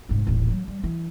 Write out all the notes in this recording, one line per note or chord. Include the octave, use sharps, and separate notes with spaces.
F1 G#2
D#1 A1
F#3
G3
E3